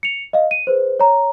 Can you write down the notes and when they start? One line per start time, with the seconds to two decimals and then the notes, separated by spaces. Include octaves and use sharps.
0.03 C#7 F7
0.33 D#5 F5
0.51 D#7
0.67 G#4 B4 C5
1.00 C#5 A#5